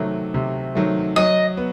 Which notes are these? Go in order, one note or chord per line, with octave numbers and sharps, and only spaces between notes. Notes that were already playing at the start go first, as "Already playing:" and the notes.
Already playing: C3 D#3 F#3 A3
C3
D#3 F#3 A3
F#3 D#5
B3